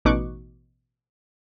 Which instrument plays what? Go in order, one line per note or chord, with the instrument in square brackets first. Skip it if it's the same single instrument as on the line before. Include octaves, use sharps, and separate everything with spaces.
[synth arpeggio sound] A1 B2 D#4 C#6 D6 F#6